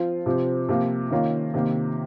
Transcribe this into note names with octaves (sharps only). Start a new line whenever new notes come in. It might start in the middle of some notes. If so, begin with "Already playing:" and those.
Already playing: F3 C4 F4
C3 F3 C4
C3 F3 A#3 F4
D#3 A#3 C#4 F4
C3 D#3 A#3